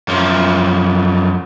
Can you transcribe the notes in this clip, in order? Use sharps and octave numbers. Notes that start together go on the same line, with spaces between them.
F#2 F3